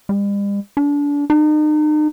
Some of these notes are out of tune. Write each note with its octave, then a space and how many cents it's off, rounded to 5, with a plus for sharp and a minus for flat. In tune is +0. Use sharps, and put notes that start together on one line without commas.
G3 +45
D4 -30
D#4 -40